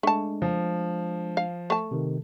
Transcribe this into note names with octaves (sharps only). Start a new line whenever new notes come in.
G#3 A3 D4 A5
F3
F5
A3 A5
C3 D#3